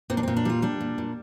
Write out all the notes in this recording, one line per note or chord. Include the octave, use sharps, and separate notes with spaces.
A#2 C4
D4
A#2 C4
D4
G3 F4
G3 D4
A#2
A#2